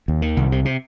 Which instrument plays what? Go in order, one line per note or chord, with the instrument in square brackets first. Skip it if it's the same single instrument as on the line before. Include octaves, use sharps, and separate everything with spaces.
[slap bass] D#2
D#3
C2
C3
C3